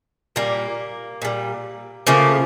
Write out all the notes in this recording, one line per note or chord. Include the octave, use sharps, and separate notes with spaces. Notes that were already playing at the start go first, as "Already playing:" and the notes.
A#2 G3 A#3
A#2 G3
C#3 F3 A3 A#3